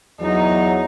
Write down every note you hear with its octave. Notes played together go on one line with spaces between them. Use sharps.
E2 F#3 D#4